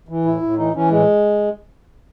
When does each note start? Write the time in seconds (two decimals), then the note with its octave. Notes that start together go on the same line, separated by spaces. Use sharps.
0.08 E3
0.25 A2 E4
0.42 A2
0.58 E3 D#4
0.74 E3 C#4
0.90 A2 G#3